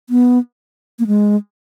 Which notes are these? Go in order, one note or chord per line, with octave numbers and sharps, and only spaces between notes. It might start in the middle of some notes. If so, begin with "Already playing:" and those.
B3
A#3
G#3